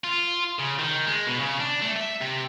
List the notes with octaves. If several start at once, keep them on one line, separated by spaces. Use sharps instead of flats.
F4
C#3
D#3
G#3
B2
C#3
D4
A3
E5
C3